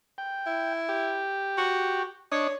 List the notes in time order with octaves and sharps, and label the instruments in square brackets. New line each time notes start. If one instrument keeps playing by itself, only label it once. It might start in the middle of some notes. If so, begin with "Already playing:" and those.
[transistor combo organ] G5
[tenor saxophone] E4
[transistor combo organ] G4
[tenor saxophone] F#4
[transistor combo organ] D4 D#5 C#6 [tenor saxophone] C#5